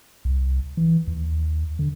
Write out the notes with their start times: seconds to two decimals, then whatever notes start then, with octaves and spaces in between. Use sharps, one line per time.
0.25 C2
0.77 E3
1.07 D#2
1.79 D3